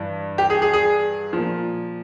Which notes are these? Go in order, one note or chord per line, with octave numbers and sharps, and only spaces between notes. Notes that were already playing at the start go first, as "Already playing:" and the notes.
Already playing: G2 E3
G4
G#4
G#4
G#4
A#2 F3